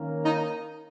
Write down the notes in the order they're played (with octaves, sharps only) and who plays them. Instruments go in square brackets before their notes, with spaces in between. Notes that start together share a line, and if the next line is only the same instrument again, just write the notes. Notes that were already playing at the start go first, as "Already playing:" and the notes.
Already playing: [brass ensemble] D#3 A#3 C#4
[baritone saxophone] D#4